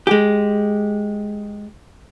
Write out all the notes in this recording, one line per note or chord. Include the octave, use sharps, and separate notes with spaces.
G#3 G4